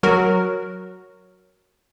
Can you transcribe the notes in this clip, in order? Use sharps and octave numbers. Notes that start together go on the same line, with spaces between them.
F#3 F#4 A#4